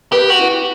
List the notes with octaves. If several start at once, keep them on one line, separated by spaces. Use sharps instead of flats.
G4 B4
F#4
E4